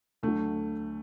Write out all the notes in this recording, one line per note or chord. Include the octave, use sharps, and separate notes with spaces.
D2 D3 F#3 A3